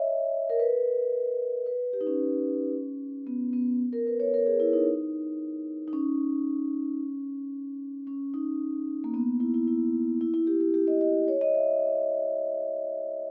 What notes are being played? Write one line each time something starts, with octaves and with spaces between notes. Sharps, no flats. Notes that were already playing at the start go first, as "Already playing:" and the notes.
Already playing: C#5 D#5 E5
A#4
B4
B4
G4
D#4
C#4
B3
B3
A#4
B4
C#5
A#4
G#4
E4
D#4
D#4
C#4
C#4
D#4
A#3
B3
E4
E4
E4
E4
E4
G4
G4
G4
D#5
D#5
C#5
D#5
E5